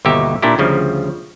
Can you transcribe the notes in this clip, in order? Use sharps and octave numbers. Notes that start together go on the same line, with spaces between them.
G1 D#2 B2 D#4 G4 E5
A#2 D4 E4 G4
D2 C#3 F3 G3